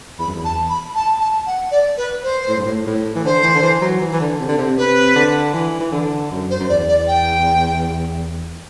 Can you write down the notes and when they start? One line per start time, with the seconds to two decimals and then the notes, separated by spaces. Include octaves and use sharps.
0.19 E2 B5
0.27 F#2
0.34 E2
0.44 A5
0.69 B5
0.95 A5
1.20 A5
1.46 F#5
1.71 D5
1.97 B4
2.23 C5
2.48 A2
2.57 G2
2.65 A2
2.86 A2
3.15 E3
3.24 D3 C5
3.43 E3
3.54 D3
3.63 E3
3.81 F#3
4.01 E3
4.13 E3
4.20 D3
4.40 C3
4.49 D3
4.58 C3
4.77 C3 B4
5.16 D3
5.54 E3
5.80 E3
5.92 D3
6.31 F#2
6.50 C5
6.59 F#2
6.69 E2 D5
6.88 D5
7.08 G5